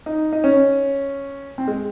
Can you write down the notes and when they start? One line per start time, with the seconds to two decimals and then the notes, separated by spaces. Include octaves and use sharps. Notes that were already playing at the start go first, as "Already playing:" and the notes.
0.06 D#4
0.33 D#4
0.44 C#4
1.58 C4
1.68 G#3